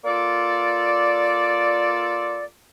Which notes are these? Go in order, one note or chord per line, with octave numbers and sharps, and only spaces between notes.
A#3 F4 A4 D5